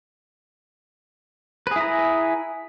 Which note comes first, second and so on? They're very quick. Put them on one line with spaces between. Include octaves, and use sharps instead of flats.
B4 G#4 E4 A#5